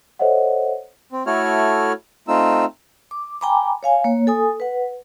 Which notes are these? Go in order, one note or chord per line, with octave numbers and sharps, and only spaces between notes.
A4 C5 C#5 D#5 E5 F#5
C4
A3 E4 F#4 A4 C#5 F6
A3 C4 D#4 F4 E6
D6
G5 G#5 A#5 B5 D6
C#5 F5 G#5
A#3 C#5
A4 G#5 D#6
B4 F#5